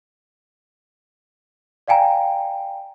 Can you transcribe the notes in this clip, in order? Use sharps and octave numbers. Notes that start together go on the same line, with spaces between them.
D5 F5 G5 G#5 A#5